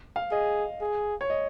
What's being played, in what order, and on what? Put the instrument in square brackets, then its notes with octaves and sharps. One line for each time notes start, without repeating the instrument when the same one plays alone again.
[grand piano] F5
[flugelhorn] G#4 [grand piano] D#5
[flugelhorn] G#4
[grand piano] C#5
D#5